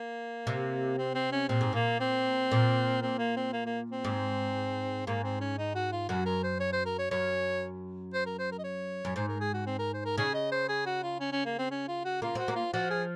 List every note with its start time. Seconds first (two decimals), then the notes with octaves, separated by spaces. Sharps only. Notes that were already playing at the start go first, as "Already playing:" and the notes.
Already playing: A#3
0.47 C3
0.98 C4
1.15 C4
1.32 C#4
1.48 A#2 C4
1.61 G#2
1.73 A#2 A#3
2.00 C4
2.52 A#2
3.02 C4
3.19 A#3
3.37 C4
3.53 A#3
3.66 A#3
3.92 C4
4.04 G#2
5.07 G#2 A#3
5.24 C4
5.41 C#4
5.58 D#4
5.75 F#4
5.92 F4
6.09 F#2 F#4
6.26 A#4
6.43 C5
6.60 C#5
6.73 C5
6.86 A#4
6.99 C#5
7.11 F#2 C#5
8.14 C5
8.26 A#4
8.39 C5
8.52 A#4
8.59 D#5
8.64 C#5
9.05 F#2
9.16 G#2 C5
9.28 A#4
9.41 G#4
9.54 F#4
9.67 C4
9.79 A#4
9.94 C5
10.05 A#4
10.18 C#3 G#4
10.34 D#5
10.52 C5
10.69 G#4
10.86 F#4
11.03 F4
11.20 C#4
11.33 C#4
11.46 A#3
11.59 C4
11.71 C#4
11.88 F4
12.05 F#4
12.22 A#3 F4
12.35 C4 F#4
12.48 A#3
12.56 F4
12.73 F3 F#4
12.90 G#4